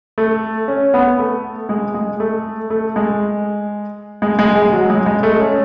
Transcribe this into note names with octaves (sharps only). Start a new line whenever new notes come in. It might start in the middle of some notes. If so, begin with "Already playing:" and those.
A3
C#4
B3
A3
G#3
G#3
A3
A3
G#3
G#3
G#3
G#3
F#3
G#3
G#3
A3
C#4